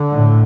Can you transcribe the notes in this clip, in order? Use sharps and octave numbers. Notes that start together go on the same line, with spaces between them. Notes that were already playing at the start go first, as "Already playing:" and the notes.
Already playing: D3
A2